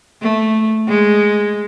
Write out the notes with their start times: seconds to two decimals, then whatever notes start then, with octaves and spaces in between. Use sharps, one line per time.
0.22 A3
0.88 G#3